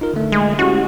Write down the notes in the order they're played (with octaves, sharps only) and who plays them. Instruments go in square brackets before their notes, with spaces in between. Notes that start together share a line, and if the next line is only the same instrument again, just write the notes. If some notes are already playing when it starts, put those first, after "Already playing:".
[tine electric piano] D#4 F4 A#4
D3 A3
[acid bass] G#3
[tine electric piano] C#4 E4 G4 [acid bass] F#4